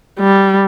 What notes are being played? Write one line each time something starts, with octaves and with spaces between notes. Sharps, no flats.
G3